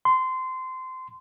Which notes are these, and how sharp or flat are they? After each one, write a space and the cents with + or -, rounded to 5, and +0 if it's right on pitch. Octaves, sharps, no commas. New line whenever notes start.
C6 -20